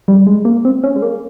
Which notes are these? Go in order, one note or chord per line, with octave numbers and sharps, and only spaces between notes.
G3
G#3
A#3
C4
C#4
G#3
A#3